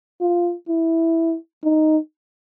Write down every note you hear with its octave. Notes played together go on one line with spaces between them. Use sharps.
F4
E4
D#4